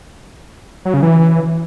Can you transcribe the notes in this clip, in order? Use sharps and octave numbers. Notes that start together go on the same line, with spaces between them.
F#3
C#3
E3